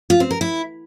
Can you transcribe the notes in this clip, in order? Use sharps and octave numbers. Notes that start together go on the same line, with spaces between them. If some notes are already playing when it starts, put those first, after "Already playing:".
F4
C4
A#4
E4